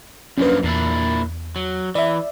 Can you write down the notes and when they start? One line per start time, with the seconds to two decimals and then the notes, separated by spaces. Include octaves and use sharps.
0.38 F#2 F3 A#3 C#4 D4 B4
0.63 E2 A#2 D4 E4
1.56 F#3
1.95 E3 D5 E5